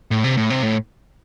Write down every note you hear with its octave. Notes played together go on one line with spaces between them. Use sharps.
A2
C3
A2
C3
A2